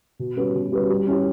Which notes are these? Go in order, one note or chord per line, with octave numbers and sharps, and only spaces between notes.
B2
G3 C#4 F#4 B4
B2
G3 C#4 F#4 B4
G3
C#4 E4 G4